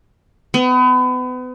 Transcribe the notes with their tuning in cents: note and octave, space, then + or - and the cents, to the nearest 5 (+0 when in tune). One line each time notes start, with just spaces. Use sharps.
B3 +35